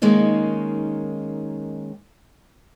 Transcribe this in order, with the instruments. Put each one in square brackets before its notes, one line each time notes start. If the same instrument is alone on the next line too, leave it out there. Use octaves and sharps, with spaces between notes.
[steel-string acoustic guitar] D#3 G#3 A#3 C#4 D#4